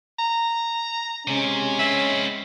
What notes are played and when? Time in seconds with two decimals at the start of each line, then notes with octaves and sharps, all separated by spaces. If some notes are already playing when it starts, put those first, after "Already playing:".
0.19 A#5
1.28 C3 G#3 C#4
1.79 C4 B4 E5